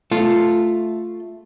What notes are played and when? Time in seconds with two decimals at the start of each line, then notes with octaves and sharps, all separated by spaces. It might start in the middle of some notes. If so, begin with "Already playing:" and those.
0.12 A3 F4